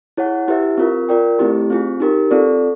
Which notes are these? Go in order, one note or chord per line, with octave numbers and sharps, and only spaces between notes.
E4 G#4 C#5 F#5
E4 G4 B4 E5
C4 F4 A#4
F4 A#4 D5 G5
A3 C4 E4 G4
C4 F4 G#4
D#4 G4 A#4
C4 F4 A4 D5